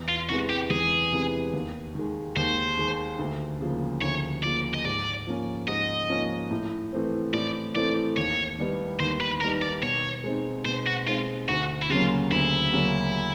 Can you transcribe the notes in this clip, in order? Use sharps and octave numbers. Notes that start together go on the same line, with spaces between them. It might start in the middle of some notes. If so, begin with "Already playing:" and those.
Already playing: E2
F4
C3 E3 G#3 B3 F#4
G4
E2 G#4
C3 E3 G#3 B3
D#2
D#3 G#3
D#2 C5
D#3 G#3
D2
C#3 F3 A#3
D2 C#5
C#3 F3 A#3 D5
D#5
G#2 D5
F3 A#3 C#4
G#2 D#5
F3 A#3 C#4
A2
E3 A3 C4
A2 D5
E3 A3 C4 D5
D#2 C#5
D#3 G3 B3 D#4
D#2 C5
B4
D#3 G3 B3 D#4 A#4
D5
B2 C#5
G#3 C4 D#4
B2 C5
F#4
G#3 C4 D#4 F4
D2 F#4
E4
C#3 F#3 A#3 C#4 F4
D2 E4
C#3 F#3 A#3 C#4